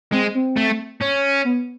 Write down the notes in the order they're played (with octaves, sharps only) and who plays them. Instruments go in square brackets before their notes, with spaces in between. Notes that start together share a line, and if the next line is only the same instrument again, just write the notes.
[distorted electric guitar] G#3 [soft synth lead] C4
[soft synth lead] C4
[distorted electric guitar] A3
C#4
[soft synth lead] B3